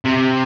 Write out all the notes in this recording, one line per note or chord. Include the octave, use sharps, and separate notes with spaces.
C3